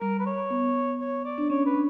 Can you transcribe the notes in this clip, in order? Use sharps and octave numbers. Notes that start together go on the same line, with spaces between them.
G3 A#4
B4
C#5
B3
C#5
D5
D4
C#4 C#5
B4
D4